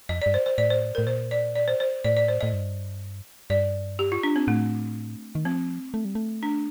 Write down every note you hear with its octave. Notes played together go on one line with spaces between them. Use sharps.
F2 D#5
G2 D5
C5
C5
A2 D5
C5
A2 A#4
A#2 C5
D5
D5
C5
C5
A2 D5
D5
C5
A2 D#5
G2
G2 D5
G4
F4
D4
C4
A2 A3
D#3
F3 C4
A3
G3
A3
D4